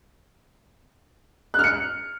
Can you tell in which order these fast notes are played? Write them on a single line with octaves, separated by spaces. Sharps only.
F#6 F6 C#7